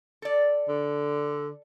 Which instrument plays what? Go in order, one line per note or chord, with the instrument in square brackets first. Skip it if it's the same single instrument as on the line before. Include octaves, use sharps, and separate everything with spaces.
[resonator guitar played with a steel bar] A4 D5
[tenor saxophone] D3